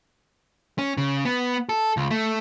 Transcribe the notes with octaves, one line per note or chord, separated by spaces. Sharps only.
C#4
C#3
B3
A4
C#2
A3